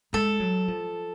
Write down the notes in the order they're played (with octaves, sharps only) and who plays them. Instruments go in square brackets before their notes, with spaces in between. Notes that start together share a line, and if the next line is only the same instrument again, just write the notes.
[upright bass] G#3 [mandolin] A4
[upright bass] F#3
F3